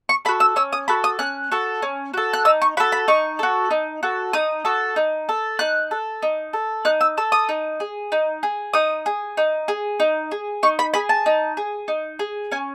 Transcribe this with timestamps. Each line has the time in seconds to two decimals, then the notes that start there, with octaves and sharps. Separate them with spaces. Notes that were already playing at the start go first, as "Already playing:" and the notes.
0.09 C#6
0.25 A4 B5
0.28 F#4
0.40 E6
0.56 C#4 E6
0.73 D#6
0.88 F#4 A4 B5
1.04 D#6
1.19 C#4 F#6
1.51 F#4 A4
1.82 C#4
2.14 F#4 A4
2.33 F#6
2.45 D#4 E6
2.62 C#6
2.77 F#4 B5
2.80 A4
2.92 B5
3.08 D#4 C#6
3.39 F#4 A4
3.71 D#4
4.03 F#4 A4
4.33 D#4 D#6
4.65 F#4 A4
4.96 D#4
5.29 A4
5.59 D#4 F#6
5.91 A4
6.22 D#4
6.53 A4
6.85 D#4 F#6
7.01 E6
7.17 A4 E6
7.32 D#6
7.49 D#4
7.80 G#4
8.12 D#4
8.43 G#4
8.73 D#4 D#6
9.06 G#4
9.37 D#4
9.68 G#4
10.00 D#4
10.31 G#4
10.63 D#4 C#6
10.79 B5
10.94 G#4 B5
11.09 A5
11.26 D#4
11.57 G#4
11.88 D#4
12.19 G#4
12.51 C#4 G#5